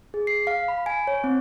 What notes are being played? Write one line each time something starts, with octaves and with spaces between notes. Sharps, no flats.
G#4
C7
F5
B5
G#5
C#5
C4